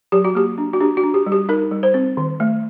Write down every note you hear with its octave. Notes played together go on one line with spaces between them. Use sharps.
F#3 G4
F#4
A#3 G4
D4
F#4
D4 G4
F#4
D4
G4
G3
G4
D#4 A#4
G3
C5
C4
D#3
A3